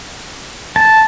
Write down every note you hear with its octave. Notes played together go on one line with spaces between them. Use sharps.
A5